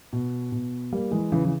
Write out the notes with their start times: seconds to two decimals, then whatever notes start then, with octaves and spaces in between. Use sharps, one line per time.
0.13 B2
0.52 B2
0.92 G3 A#3
1.11 E3 G#3
1.32 C#3 E3
1.45 E3